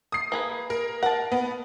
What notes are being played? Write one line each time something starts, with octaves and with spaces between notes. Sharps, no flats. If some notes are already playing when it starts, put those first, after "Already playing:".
D#6 C7
A#3 G#4 B4
A#4
A#4 F#5 A5
B3